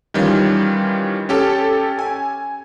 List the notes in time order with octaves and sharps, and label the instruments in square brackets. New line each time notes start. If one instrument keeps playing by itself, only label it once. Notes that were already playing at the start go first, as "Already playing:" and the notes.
[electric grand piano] D#3 E3 G3 C#4 F4
C#4 G4 A4
G#5